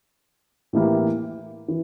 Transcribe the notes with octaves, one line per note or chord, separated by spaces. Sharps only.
A2 E3 A#3 E4 G4
E3